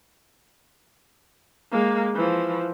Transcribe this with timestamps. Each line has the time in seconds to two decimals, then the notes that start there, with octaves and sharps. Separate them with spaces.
1.71 G#3 A#3
2.15 E3 F3